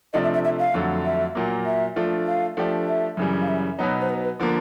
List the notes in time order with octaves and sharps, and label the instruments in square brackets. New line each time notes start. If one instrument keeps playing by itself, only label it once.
[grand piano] C3 F3 A3 D4 [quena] D#5
[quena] E5
E5
E5
F5
[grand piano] F2 D3 F#3 A3
[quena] E5
[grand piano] A#2 F#3 A#3
[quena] E5
[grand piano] F3 A3 D4 F4
[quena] F5
[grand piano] F3 A3 D4 G4
[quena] E5
[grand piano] F#2 C#3 E3 G3
[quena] F5
E5
[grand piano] B2 F#3 B3 D#4 [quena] C#5
[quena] C5
B4
B4
[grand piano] D3 F3 A#3